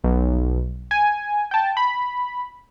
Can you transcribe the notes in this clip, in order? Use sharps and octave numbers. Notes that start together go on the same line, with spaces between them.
B1
G#5
G5 A5
B5